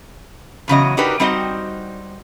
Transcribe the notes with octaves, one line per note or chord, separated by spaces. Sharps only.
E2 C#3 F#3 D#5
D4 D#4 F#4 G4 A#4 B4
G3 C4 D#4 F#4 C5 D#5